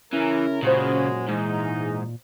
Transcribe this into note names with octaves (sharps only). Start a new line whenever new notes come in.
C#3 E3 C#4 E4 A#4
F#2 A#2 C#3 F#3 G#3 E4 G4 C5
G#2 E3 G#3 D#4